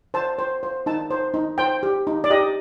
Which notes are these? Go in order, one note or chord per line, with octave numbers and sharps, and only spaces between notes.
C5 A5
C5
C5
D#4 A5
C5
D#4
C5 G5
G4
D#4
D5
G4 D#5